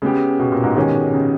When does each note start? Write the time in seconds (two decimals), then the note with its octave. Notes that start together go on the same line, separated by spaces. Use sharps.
0.02 C#3 G#3 B3 G4
0.39 B2
0.52 A#2
0.64 G#2
0.76 B2 D#3 G#3 C#4 G4
1.13 C#3